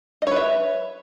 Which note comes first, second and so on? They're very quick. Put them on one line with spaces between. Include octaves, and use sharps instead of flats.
D#5 C#5 B4 E5